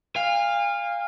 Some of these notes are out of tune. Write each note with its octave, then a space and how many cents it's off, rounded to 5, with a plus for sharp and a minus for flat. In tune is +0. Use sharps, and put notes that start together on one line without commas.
F5 +0 G#5 -40